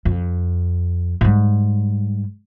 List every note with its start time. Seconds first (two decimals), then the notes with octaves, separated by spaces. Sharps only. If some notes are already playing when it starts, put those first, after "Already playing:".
0.05 F2
1.21 G#2 G3